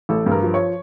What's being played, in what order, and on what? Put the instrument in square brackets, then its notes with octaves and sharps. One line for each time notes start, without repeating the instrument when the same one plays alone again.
[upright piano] A1 A4
G2
A#4
F3
C#5